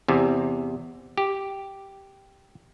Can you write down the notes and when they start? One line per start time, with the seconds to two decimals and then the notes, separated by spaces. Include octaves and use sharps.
0.08 E2 C3
1.18 G4